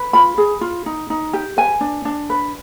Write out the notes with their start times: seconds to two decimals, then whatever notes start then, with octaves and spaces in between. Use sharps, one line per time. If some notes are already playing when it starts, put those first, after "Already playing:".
Already playing: B4
0.13 F4 B5
0.38 G#4
0.61 F4
0.86 D#4
1.10 D#4
1.33 G4
1.57 B4 G#5
1.81 D4
2.05 D4
2.30 B4